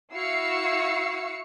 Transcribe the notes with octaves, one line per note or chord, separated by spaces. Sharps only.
E4 F#4 F5 E6 C7 C#7